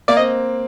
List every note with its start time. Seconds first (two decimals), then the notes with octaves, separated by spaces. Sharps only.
0.08 A#3 D5
0.17 C4 D#5